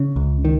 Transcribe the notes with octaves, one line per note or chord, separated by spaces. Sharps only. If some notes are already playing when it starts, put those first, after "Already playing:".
Already playing: C#3
C#2
D#3